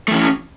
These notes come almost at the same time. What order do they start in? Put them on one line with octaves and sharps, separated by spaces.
A3 E3 C#4